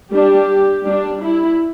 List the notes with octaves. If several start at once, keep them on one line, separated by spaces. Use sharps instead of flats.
G3 D4 G4
G3 D4
E4